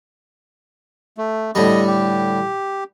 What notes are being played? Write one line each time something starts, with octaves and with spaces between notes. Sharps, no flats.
A3
A2 D3 G3 D#5
G4